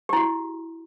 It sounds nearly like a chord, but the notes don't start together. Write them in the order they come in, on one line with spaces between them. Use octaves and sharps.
G4 E4 F#4